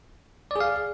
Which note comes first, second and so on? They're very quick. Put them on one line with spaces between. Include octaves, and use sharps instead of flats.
D5 G#4 F5